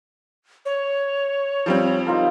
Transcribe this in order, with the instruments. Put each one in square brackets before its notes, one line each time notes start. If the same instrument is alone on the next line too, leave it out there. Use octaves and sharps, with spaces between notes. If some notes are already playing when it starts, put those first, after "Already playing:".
[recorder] C#5
[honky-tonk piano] F3 G3 C4
[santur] D#4 F4 A#4